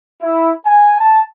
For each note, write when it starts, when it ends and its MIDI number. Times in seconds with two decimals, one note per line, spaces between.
0.22 0.50 64
0.65 0.97 80
1.00 1.22 81